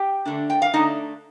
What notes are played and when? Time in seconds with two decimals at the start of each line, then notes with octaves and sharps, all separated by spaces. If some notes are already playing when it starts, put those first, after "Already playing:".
Already playing: G4 G5
0.25 D3 A3 D4
0.50 G5
0.62 F5
0.74 D3 A3 D4 D#4 D#5